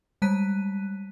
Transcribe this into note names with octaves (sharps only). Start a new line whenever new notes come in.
G3 G#3 A5 F#6 B6 D#7